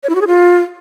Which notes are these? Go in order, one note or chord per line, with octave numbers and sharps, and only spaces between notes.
C#5
E4
F#4
G#4
F4